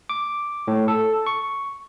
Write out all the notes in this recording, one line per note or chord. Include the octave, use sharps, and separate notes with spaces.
D6
A2
A4
C#6